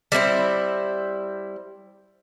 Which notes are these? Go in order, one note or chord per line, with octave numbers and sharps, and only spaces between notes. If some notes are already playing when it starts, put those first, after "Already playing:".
G3 C4 E4 C5